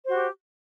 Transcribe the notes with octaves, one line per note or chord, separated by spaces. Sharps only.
F#4 G4 C5